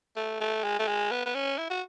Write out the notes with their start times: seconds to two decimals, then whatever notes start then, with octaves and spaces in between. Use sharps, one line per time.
0.16 A3
0.40 A3
0.63 G#3
0.79 A3
0.87 G#3
1.11 B3
1.26 B3
1.34 C#4
1.58 E4
1.70 F#4